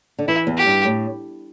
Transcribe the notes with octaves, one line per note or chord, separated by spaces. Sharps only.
D3
E3 E4
E2
G4
G2
A2